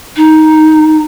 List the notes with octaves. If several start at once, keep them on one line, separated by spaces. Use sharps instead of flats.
D#4